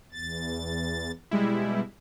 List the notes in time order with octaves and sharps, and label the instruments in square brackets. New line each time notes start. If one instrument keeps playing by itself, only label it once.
[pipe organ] E2 A6
[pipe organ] B2 [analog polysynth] G3 G#3 E4